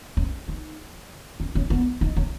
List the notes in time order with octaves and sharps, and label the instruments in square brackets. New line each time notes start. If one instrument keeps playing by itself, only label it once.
[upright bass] C#4
D#4
C#4
C#4
B3
D#4
C#4